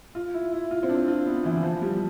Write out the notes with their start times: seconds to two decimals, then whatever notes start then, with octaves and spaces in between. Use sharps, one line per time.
0.15 F4
0.34 E4
0.53 E4
0.71 F4
0.83 C4
0.89 D4
1.08 F4
1.26 B3
1.45 E3
1.56 E3
1.63 F3
1.82 G3